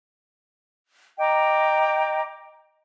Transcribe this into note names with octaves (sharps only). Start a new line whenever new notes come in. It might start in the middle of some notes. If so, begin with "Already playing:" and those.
D#5 G5 A#5 D6